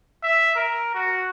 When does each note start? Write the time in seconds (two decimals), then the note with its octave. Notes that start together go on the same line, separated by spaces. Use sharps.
0.23 E5
0.56 A#4
0.94 F#4